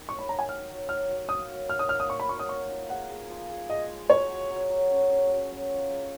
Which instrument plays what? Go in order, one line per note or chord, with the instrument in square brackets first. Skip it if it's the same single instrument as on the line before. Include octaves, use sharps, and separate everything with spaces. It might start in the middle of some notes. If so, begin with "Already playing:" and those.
Already playing: [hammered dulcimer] D#3
[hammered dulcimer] F#3 [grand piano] C#6
[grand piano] B5
[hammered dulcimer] D#3 [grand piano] A#5
[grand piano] G#5
[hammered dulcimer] D#3 [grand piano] F6
[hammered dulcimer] F#3
[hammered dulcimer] F#3 [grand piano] F6
[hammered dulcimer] F#3
[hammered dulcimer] A#3 [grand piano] D#6
[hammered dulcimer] F#3
[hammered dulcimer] F#3 [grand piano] F6
[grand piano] D#6
[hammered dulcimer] A#3 [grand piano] F6
[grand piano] D#6
[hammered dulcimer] A#3 [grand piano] C#6
[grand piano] B5
[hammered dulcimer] F#3 [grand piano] C#6
[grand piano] D#6
[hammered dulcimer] D#4 [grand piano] C#6
[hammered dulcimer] F3
[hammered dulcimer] G#4 [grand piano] F#5
[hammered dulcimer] G#4
F3
G#4
[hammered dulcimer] G#4 [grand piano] D#5
[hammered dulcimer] G#3
[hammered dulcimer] F#3 [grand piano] C#5
[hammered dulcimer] F#4
F#3
F#3
C#4
C#4
F#3
F#3
F4
G#4